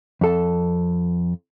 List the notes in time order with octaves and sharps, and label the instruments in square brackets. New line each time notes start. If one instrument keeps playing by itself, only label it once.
[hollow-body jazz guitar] F2 A4 A5